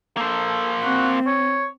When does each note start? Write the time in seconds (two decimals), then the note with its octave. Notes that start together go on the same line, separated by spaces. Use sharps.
0.17 A#3 A4 C5
0.83 C4 F#4
1.27 C#5